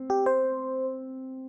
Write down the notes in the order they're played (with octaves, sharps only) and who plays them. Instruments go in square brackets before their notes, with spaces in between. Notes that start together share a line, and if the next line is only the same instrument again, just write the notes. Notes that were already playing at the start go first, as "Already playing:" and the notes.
Already playing: [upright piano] C4
[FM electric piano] G4
C5